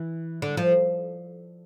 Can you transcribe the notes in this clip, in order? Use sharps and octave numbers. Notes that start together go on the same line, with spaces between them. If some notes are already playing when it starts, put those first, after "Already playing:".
Already playing: E3
D3
F3